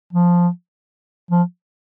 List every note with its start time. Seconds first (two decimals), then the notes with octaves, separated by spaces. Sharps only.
0.13 F3
1.31 F3